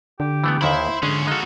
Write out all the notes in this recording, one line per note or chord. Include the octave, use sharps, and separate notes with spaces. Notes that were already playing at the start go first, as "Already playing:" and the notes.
D3 G4
E3 A3 B3
D#2 D#3 E4 C5 E5 B5
G#2 D3 G#3 C#4 G#4
G#3 D#4 F#4 A4 F5